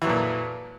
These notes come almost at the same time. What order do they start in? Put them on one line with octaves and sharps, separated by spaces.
E3 F#3 F2 A#2